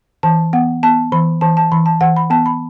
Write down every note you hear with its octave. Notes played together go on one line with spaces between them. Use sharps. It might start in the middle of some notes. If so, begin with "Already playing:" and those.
E3 A5
B3 F#5
B3 A5
E3 B5
E3 A5
A5
E3 B5
A5
E3 F#5
B5
B3 A5
B5